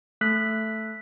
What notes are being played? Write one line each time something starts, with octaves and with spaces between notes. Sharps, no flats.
A3 A4 F#6 B6